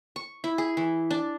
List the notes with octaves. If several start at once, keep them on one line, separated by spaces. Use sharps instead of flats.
C#6
E4
G#4
E3
D4